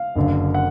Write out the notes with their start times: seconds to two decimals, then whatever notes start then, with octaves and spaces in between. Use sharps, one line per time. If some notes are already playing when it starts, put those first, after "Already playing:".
Already playing: F5
0.16 F#1 F#2 D3
0.54 F#5